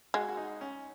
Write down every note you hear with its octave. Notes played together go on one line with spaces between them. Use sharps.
G#3 F#4
F#4
D#4
C#4